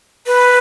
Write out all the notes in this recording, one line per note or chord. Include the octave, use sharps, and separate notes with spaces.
B4